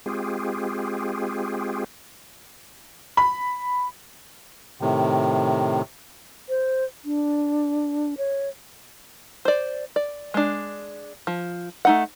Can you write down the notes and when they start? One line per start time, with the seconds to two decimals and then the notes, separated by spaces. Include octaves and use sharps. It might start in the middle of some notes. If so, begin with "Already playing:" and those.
0.06 G#3 C4 F4 G4 G#4
3.17 B5
4.81 A2 C3 D#3
6.49 C5
7.05 D4
8.18 C#5
9.45 C5 D5
9.96 D5
10.34 G#3 D4
11.27 F3
11.85 A3 D#4 F#5